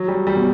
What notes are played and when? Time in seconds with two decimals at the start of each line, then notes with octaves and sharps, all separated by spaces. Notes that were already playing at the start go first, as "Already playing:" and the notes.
Already playing: F#3
0.08 G3
0.27 G3
0.36 B2